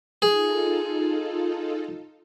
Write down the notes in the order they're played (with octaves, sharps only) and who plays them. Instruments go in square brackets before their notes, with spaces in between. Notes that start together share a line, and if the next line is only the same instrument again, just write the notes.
[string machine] D#4 F4 A4 [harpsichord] G#4